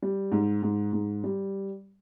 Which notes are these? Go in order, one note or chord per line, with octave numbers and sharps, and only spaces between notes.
G3
G#2
G#2
G#2
G3